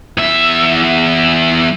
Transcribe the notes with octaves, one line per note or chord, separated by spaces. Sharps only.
E2 E5